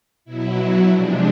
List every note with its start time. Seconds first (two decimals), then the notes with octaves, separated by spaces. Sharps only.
0.25 B2 F#3 E4
0.56 E4
0.87 C3 F3 G#3 D4